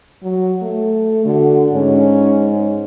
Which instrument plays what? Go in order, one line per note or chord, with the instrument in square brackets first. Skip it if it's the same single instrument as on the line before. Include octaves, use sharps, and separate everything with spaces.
[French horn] F#3
A3
[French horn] D3 [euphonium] F#4
[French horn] G#2 [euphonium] C#4